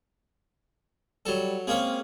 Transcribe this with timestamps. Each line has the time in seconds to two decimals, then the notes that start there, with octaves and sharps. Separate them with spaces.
1.26 F#3 G3 A4
1.67 G#3 A#3 C4 C#4